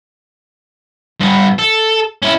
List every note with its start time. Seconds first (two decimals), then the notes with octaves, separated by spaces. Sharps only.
1.20 G2 B3
1.59 A4
2.23 C#4 E4